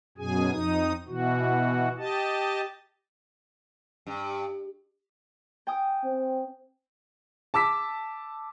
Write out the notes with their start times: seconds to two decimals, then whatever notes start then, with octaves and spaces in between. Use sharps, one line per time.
0.18 F#2 B2 G#4 G#5
0.51 F2 D#4 D#6
1.08 B2 E3 F#4
1.98 G4 D#5 A5
4.07 G2
5.67 G5 G#5 D#6
6.04 C4
7.54 A5 D6 E6 B6